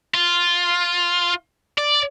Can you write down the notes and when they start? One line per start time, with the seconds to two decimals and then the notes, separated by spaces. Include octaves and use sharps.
0.14 F4
1.78 D5